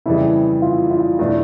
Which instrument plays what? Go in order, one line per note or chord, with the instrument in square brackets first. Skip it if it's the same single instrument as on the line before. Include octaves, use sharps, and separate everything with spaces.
[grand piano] F2 C#3 E3 G3 [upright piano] E4
[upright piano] F4
F4
[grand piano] E2 B2 F#3 A3 D4 [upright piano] E4